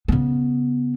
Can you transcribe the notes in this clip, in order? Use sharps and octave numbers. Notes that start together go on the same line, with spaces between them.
C#3 B3